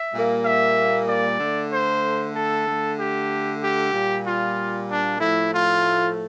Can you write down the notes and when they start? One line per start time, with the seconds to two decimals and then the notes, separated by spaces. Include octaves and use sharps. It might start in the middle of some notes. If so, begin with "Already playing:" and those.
Already playing: E5
0.11 A#2 G3 A#3
0.43 E5
1.06 D5
1.38 D3 A3
1.70 C5
2.33 A4
2.65 D3 A3
2.97 G4
3.61 G4
3.92 A#2 G3 A#3
4.24 F4
4.87 D4
5.19 A2 F3 A3 E4
5.51 F4